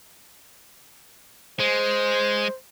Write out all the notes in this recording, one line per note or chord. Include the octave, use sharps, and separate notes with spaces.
G#3 C5